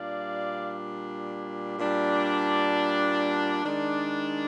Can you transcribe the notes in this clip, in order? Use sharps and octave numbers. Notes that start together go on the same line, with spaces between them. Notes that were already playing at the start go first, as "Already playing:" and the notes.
Already playing: A#2 G3 D4 D5 F5
A#2 G3 D4
D#3 G#3 D4